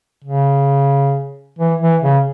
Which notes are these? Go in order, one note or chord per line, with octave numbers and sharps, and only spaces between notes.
C#3
E3
E3
C#3